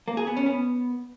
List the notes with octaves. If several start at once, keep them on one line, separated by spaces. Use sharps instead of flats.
A#3
G#4
B3
C#4
B3